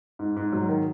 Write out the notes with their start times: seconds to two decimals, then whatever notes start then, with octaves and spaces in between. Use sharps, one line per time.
0.19 G#2
0.36 G#2
0.53 F#3
0.68 D#3